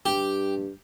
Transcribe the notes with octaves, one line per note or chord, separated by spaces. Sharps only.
G2 G4